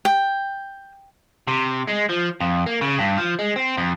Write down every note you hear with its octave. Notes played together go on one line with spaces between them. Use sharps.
G5
C3
G#3
F3
F2
A#3
C#3
G2
F3
G#3
C4
F2